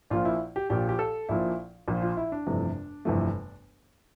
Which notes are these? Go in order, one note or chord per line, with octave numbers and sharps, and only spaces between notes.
A#1 A#2 F3 F4
E4
G4
A#1 A#2 F3 G4
G4
A4
A#1 A#2 F3 E4
A#1 A#2 F3
F4
E4
D4
G1 F2 C3 E3 A3
G1 F2 C3 E3 A3